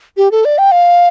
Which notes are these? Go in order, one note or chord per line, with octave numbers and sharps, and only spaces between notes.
G4
A4
D5
G5
F5